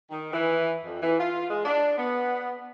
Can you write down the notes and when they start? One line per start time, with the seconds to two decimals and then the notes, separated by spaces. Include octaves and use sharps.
0.10 D#3
0.33 E3
0.83 F2
1.02 E3
1.19 F4
1.49 G#3
1.65 D4
1.98 B3